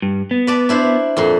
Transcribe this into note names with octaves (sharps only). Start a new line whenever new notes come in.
G2
B3
B4 D5 A5
D4 E4 C5
F2 A#2 C6